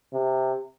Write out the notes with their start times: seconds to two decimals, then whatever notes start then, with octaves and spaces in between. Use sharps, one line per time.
0.13 C3